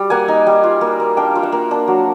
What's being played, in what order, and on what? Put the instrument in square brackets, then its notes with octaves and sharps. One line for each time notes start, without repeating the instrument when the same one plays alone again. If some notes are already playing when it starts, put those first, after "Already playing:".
Already playing: [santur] G3
A#3 F#5 G#5
D#4
G3
F4
A#3
A#3
D4 F5 G5
F4
E5 F#5
A#3
D4
F#3